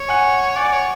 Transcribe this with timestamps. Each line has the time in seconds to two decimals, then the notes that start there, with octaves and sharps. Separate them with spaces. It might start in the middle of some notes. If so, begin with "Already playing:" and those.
Already playing: C#5
0.08 F#5 G#5
0.56 D5 F#5 G#5
0.73 C#5